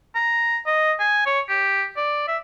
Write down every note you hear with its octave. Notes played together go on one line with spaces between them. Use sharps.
A#5
D#5
G#5
C#5
G4
D5
E5